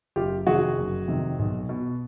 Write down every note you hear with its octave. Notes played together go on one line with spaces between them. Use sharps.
F#1 F4 G4
F2 C3 D#3 F#4 G#4
F#1
F2 C3 D#3
B1
B2